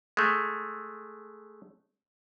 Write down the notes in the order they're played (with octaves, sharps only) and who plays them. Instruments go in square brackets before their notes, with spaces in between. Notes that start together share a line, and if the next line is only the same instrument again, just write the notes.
[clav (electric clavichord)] G#3 A3